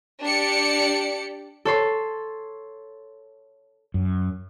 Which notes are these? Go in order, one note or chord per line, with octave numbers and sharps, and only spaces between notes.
D4 G4 D5 C#7 D7
A4 C#5 C6
F#2